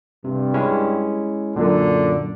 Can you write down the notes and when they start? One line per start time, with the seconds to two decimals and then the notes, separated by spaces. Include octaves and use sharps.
0.24 G2 C3
0.54 G#3 C#4 E4
1.56 F#2 A#2 D3